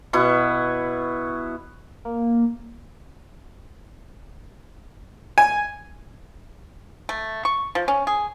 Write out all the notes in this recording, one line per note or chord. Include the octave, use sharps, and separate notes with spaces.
B2 E4 B4 C#6
A#3
G#5
A3
C#6
F3
C#4
G#4